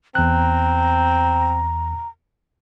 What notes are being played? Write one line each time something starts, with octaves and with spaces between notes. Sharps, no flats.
E2 C4 A#5 F#6